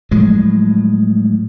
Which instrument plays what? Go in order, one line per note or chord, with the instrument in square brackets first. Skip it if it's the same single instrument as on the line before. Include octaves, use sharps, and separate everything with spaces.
[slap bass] A2 F3 F#3 G#3